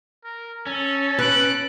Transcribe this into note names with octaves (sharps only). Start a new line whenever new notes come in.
A#4
C#4 A4
B4 F#6 D7